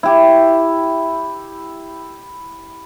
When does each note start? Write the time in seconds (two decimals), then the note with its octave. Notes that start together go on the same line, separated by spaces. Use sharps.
0.03 E4 G4